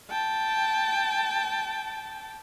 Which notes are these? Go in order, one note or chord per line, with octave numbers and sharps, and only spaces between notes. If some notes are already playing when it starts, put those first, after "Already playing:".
G5 A5